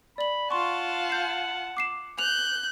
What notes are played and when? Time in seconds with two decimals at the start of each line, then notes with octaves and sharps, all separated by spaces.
0.18 D5 B5 F#7
0.51 F4 F#5 A5 C6 C#6
1.10 G6 C7
1.77 D6 C7 E7
2.19 F#6 G6 F7